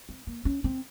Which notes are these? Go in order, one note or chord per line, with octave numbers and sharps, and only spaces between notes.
C4
A#3
C#4
C4